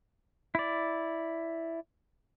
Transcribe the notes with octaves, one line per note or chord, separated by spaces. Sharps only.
E4 D5